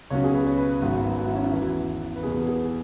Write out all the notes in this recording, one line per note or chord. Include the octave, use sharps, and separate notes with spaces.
C#2 B2 F#3 C#4 C#5
G#4
B4
C#5
B4
G#1 G#2 F#3 B3 F#4
F#4
E4
C#4
E4
E2 E3 B3 F#4
B4
E2 B2 B3 G#4
G#4